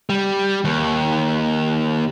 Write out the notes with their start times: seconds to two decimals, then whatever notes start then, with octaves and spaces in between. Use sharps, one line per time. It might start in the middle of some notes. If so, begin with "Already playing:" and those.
0.09 G3
0.65 D#2